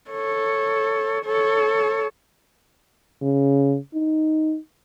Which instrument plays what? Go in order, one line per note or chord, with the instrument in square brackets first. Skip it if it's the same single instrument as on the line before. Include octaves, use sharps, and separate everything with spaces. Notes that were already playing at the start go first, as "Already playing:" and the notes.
[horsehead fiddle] A4 C#5
A4 C#5
[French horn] C#3
D#4